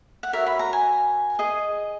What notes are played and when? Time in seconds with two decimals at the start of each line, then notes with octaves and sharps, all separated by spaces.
0.23 F#5
0.33 F#4 A#4 C#5 E5
0.46 B5
0.59 A#5
0.73 G#5
1.39 G#4 D#5